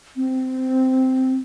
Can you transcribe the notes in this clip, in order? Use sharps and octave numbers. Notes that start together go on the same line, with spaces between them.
C4